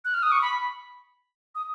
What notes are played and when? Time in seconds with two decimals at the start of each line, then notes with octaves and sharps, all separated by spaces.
0.05 F#6
0.14 F6
0.23 D#6
0.32 C#6
0.42 B5
1.55 D#6